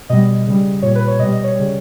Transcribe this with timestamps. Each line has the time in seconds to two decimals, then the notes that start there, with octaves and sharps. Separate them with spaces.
0.09 B2 G3 D#5
0.46 C#3 G3
0.82 A#2 G3 C#5
0.95 B4
1.08 C#5
1.19 B2 G3 D#5
1.32 D#5
1.44 C#5
1.56 C#3 G3